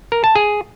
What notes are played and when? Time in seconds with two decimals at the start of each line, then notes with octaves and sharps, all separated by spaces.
0.12 A#4
0.24 A5
0.36 G#4